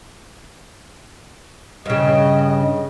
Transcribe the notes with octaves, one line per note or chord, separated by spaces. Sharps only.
G2 C#3 D#5